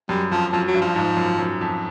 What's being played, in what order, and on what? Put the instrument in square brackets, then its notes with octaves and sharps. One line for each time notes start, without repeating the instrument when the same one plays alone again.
[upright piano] F#2 [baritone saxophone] G3
[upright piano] F2 [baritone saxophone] F3
[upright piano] F#2 [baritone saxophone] F3
[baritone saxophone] F#3
[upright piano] G2
[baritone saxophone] F3
[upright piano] G#2
F#2
F#2
F2